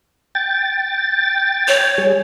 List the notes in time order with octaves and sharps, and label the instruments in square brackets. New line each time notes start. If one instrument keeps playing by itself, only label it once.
[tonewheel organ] G5 A6
[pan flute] C#5
[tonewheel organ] G3 G#4